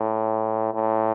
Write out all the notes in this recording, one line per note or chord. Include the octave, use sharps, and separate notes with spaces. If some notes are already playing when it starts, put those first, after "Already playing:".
Already playing: A2
A2